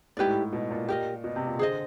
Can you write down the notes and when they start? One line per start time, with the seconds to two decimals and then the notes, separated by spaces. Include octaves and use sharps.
0.17 G#2 E4 G4 B4 D5
0.26 A2
0.53 B2
0.71 A#2
0.88 G4 A#4 D#5
1.24 B2
1.36 C3
1.47 A#2
1.59 D3 G#4 C5 D#5